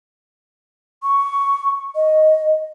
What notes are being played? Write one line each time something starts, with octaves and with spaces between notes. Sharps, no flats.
C#6
D#5